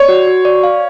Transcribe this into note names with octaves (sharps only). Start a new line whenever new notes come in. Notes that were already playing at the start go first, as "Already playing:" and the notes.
Already playing: C#5 D5
F#4
F#4
D5
F5